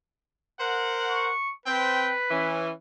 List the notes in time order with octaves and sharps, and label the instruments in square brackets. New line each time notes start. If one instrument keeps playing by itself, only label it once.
[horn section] A#4 C5 F#5
[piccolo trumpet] C#6
[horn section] C4 G5 [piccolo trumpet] B4
[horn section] E3 C#4